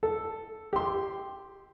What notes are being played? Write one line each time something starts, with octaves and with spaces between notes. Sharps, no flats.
A4
G4 C6